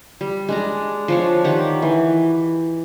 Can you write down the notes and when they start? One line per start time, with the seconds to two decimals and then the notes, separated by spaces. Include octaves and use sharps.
0.21 G3
0.49 G#3 D4 A#5
1.08 F3 D4 C#5
1.44 D#3 G4 F#5
1.82 E3